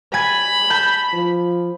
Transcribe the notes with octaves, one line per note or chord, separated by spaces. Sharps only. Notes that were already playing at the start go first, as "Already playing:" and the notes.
G#5 B5 G#6 A6
A5 G6
F3